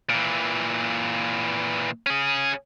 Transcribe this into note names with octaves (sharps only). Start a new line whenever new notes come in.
A#2 E3
C#4 G#4